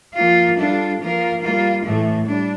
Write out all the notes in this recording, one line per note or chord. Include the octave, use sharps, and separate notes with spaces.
F3 A#3 F4
G3 D4 F4 A4
F3 A#3 F4 A#4
G3 A#3 F4
A2 E3 A3
G3 D4